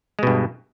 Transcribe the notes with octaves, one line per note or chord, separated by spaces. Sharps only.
G2 B2 G#3